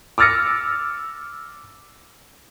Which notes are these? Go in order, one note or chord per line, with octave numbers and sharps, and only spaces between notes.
D6 E6 F6 A6 A#6 C#7